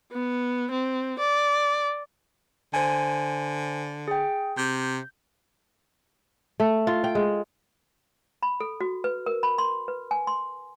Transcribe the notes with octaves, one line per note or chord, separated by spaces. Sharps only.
B3
C4
D5
D3 C5 G#5
G#4 G5
C3 G6
A3
F4
G5
G#3
B5
A4
F#4
B4
A#4
B5
C6
B4
G#5
C6